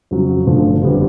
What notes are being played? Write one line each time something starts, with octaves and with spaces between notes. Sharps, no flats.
F2 C#3 F#3
G1 F#2 D3 F3 A3
F#1 F2 D3 G3 B3